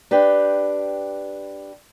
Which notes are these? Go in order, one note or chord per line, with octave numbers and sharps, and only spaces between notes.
D4 G4 B4 G5